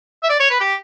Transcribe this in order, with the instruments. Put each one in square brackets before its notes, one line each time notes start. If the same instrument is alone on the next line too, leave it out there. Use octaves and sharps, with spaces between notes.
[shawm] E5
D5
C#5
B4
G4